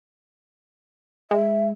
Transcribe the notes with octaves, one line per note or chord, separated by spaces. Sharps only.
G#3 E5